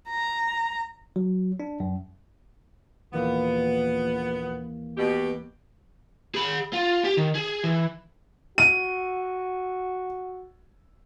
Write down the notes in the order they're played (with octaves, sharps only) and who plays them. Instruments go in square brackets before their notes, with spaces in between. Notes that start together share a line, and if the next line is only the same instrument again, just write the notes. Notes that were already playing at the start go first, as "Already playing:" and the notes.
[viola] A#5
[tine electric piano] F#3
D4
F#2
[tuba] A#1 [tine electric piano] D#2 E3 A#3 [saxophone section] B3
[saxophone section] B2 G4 [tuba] B3
[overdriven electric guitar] G#4 B5
F4
G4
D#3
G#4
E3
[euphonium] F#4 [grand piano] D#7